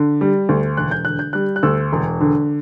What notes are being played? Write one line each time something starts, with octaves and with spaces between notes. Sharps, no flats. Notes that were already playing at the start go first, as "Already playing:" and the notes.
Already playing: D3
G3
D2
E1 F#6
G6
D3 F#6
G6
G3 F#6
F#6
D2 E6
E1
D3